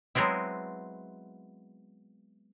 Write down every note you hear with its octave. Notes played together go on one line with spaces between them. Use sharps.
F#3 G#3 B3 C4 E4